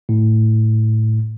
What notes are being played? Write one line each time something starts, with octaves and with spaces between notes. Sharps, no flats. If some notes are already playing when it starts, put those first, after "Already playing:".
A2